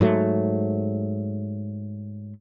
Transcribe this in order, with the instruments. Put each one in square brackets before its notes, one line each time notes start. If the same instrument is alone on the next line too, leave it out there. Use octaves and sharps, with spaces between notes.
[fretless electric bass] G#2 F#3 A3